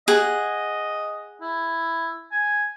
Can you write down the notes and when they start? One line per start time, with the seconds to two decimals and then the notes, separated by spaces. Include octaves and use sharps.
0.08 G#4 D#5 F#5
1.41 E4
2.32 G#5